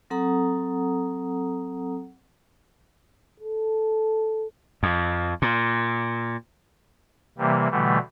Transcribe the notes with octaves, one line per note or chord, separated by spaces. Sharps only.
F#3 C4 A4 F#5 A#5 D#6
A4
F2
A#2
C3 E3 G3 A#3
B2 D3 E3 G3 A3